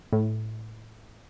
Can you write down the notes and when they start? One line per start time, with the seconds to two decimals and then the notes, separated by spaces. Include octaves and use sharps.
0.13 A2